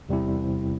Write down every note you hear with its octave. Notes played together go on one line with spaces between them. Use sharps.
E2 C3 G3 C4 E4